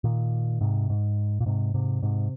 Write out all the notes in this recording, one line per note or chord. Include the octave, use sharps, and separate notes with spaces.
A#2 D#3
G#2 C3
G#2
A#2
G#2 C3
G#2 C3
G#2 C3